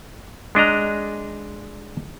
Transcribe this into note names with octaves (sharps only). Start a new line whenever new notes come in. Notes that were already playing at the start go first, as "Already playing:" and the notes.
G#3 D4 D#5 A#5